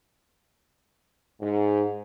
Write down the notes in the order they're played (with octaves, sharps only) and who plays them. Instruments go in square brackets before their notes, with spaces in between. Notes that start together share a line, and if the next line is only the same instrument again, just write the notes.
[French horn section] G#2